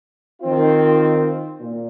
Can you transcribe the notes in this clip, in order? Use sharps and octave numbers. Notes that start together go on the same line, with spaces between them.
D#3 C4 F4
A#2